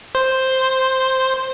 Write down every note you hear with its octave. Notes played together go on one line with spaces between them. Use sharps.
C5